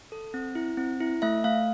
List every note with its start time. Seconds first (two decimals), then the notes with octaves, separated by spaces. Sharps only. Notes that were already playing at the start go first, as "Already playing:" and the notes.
0.12 A4
0.34 C4
0.55 E4
0.77 C4
1.01 E4
1.22 A3 E5
1.44 A3 F5